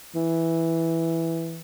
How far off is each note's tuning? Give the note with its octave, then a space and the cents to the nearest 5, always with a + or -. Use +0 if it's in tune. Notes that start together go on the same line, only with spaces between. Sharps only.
E3 +0